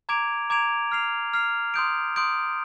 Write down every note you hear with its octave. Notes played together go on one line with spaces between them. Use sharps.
A#5 D6 G#6 D7 F7
A#5 D6 G#6 D7 F7
F6 C7 F7
F6 C7 F7
C6 D#6 G6 D7
C6 D#6 G6 D7